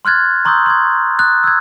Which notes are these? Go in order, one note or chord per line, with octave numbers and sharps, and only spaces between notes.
C6 F6 F#6 G#6 A6
A#5 C6 C#6 D#6 E6 G6
C6 D#6 G#6
D#6 F#6 A6
E6 G6 G#6